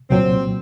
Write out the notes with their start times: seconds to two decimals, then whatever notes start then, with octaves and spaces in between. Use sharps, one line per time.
0.10 C2 A#2 F#3 C4